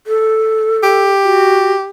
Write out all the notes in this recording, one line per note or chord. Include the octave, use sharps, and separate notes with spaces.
A4
G4
F#4